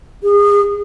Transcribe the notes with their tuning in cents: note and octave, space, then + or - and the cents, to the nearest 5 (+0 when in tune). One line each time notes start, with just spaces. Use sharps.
G#4 -35